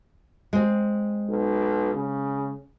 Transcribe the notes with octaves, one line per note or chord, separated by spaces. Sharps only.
G#3 C4
B1
C#3